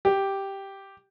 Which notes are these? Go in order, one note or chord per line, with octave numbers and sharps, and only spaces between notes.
G4